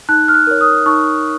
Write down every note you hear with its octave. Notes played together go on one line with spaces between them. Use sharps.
D#4 F#6
F6
F#6
A#4 C#5
D#6
D#4 C#6